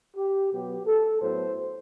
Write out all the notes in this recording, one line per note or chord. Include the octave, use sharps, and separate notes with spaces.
G4
B2 F#3 B3 G4
A4
A2 F#3 B3 C5